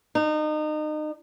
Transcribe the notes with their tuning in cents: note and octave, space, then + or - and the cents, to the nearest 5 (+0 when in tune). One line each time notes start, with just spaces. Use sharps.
D#4 -30